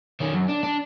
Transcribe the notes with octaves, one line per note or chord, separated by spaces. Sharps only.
D#3 C#4
F#2
D4
D4